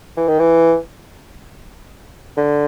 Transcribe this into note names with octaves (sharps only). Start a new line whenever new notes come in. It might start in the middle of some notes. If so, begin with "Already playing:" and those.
E3
D#3
E3
D3